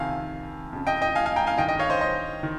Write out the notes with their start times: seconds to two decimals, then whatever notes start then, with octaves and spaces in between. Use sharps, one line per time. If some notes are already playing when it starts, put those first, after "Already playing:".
Already playing: F2 C3 D#3 F5 G#5
0.73 F2 C#3
0.87 D#5 G5
1.02 D#5 G5
1.15 F5 G#5
1.26 F5 G#5
1.36 G5 A#5
1.47 F5 G#5
1.58 G2 D#3 D#5 G5
1.69 D#5 G5
1.79 C#5 F5
1.90 C5 D#5
2.01 C5 D#5
2.43 D#3